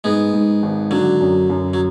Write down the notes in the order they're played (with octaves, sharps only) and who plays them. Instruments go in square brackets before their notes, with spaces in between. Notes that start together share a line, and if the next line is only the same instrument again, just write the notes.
[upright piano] G#2 [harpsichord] G#3 B3
[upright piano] G#2
G#1
[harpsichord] D3 F#3 [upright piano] D4
[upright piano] F#2
F#2
[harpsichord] F#3